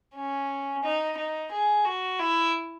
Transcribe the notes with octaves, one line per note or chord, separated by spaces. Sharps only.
C#4
D#4
D#4
G#4
F#4
E4